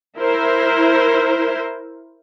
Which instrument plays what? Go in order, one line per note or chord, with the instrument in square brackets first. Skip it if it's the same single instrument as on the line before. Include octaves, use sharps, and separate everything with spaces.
[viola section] E4 A#4 C5